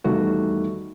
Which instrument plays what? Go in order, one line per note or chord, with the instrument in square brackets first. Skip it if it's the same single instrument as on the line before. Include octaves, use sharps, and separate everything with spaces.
[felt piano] E2 D#3 G3 A3 F#4